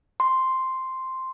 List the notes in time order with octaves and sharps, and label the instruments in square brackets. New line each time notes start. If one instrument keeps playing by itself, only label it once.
[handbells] C6